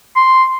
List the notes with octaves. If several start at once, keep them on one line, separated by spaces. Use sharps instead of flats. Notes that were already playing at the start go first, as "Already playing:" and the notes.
C6